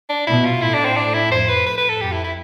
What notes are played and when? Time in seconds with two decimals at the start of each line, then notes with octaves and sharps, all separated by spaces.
0.10 D4
0.27 B2 E4
0.45 F4
0.62 A2 E4
0.74 D4
0.85 C4
0.97 D4
1.14 E4
1.32 F2 C5
1.49 B4
1.66 A2 B4
1.78 B4
1.89 A4
2.01 F2 G4
2.12 E4
2.24 E4